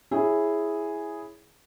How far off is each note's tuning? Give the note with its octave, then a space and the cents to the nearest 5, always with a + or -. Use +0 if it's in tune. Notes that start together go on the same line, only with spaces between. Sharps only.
E4 +0 G#4 +0 C#5 +0